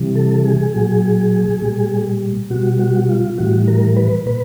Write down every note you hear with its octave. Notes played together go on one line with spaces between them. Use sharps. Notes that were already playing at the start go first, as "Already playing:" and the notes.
Already playing: C3 E3 G3
A4
G#4
A#2 F#3 G#4
A#2 G3
B2 G3 F#4
F#4
F4
A2 E3 G3 F#4
A#4
B4
A#2 B4